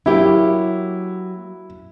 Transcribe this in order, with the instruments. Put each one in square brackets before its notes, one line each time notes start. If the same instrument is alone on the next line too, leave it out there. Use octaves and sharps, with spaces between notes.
[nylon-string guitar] F#3 A#3 G4 [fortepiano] E4